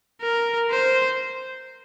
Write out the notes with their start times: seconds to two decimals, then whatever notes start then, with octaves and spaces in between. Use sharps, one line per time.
0.22 A#4
0.71 C5